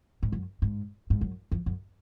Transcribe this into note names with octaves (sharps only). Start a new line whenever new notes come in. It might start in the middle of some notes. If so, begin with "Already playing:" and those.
G#2
F#2
G#2
G#2
F#2
F2
F#2